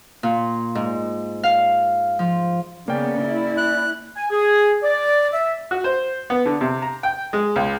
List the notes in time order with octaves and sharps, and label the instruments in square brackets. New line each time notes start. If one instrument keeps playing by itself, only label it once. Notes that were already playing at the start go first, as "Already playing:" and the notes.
[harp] A#2
G#2
F5
F3
[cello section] C#3 B3 [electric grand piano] A#3 C#4 G5 [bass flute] D5
[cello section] E4
[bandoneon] F#6
[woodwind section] G#5
G#4
D5
E5
[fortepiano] F#4
C5
B3
D3
C3
A#5
G5
G#3
C#2